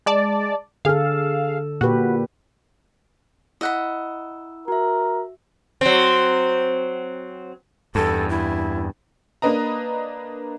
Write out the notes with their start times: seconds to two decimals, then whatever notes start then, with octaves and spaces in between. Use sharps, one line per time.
0.06 G#3 D5 A5
0.85 D3 G#4 A4 F5
1.81 A#2 F#4 G4 B4
3.61 E4 D#5 F#5 B5 E6
4.68 F#4 A#4 E5
5.81 F#3 C4
7.95 E2 G2 A4
8.29 E4
9.42 A#3 D4 B4 D#5 A#5